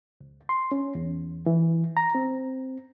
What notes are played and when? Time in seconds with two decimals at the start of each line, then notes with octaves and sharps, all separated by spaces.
0.21 C#2
0.49 C6
0.72 C#4
0.95 E2
1.46 E3
1.97 A#5
2.15 C4